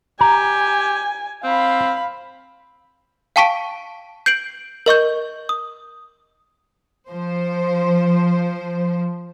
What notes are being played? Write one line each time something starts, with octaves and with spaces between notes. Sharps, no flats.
G4 G#5 A#5
C4 F5 B5
F5 G5 A5 C#6 B6 D7
G6 C7 D7 F#7
A#4 D#5 C#6 G6
D#6
F3 C5